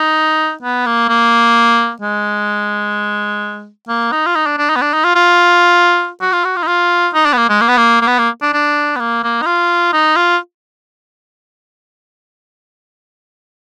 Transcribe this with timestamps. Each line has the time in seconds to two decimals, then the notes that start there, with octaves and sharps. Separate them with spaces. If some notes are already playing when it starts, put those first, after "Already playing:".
Already playing: D#4
0.62 B3
0.86 A#3
1.09 A#3
2.02 G#3
3.88 A#3
4.12 D#4
4.26 F4
4.35 D#4
4.46 D4
4.58 D4
4.69 D#4
4.76 B3
4.81 D4
4.94 D#4
5.04 F4
5.16 F4
6.21 F#4
6.33 F4
6.44 F#4
6.56 F4
6.63 D#4
6.67 F4
7.14 D#4
7.26 D4
7.33 B3
7.37 A#3
7.49 G#3
7.61 A#3
7.68 B3
7.77 A#3
8.02 A#3
8.07 B3
8.19 A#3
8.42 D4
8.54 D4
8.96 B3
9.00 A#3
9.24 A#3
9.42 D#4
9.46 F4
9.93 D#4
10.16 F4